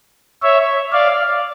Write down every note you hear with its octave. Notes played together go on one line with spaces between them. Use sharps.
C#5 E5
D5 F5